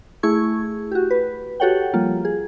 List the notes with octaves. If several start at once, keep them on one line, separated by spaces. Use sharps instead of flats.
A3 E4 G#4 C#6 G#6
F#4 G4
B4
F#4 G4 A4 C#5 F#5 G5
F3 G3 A#3 F4
G#4